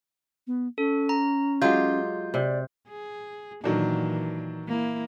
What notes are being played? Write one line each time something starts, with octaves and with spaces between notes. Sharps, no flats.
B3
C#4 A4
A#5
F#3 G#3 F4 G4 G6
C3 D5
G#4
A#2 D#3 E3 F#3 D4
A#3 E4